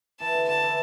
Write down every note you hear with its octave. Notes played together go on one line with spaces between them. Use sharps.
E3 A5
D3
D3 A5
E3